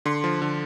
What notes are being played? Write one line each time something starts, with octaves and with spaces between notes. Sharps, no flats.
D3 C6
F3
D3